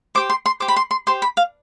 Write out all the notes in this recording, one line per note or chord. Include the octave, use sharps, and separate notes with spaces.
G4 C5 D6
C6
C6
G4 C5 D6
B5
C6
C6
G4 C5 C6
B5
F5